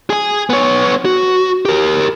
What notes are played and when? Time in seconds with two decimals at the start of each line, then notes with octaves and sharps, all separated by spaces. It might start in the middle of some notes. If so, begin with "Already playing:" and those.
0.10 G#4 G#5
0.50 B3 C#5
1.05 F#4
1.65 G4 A#4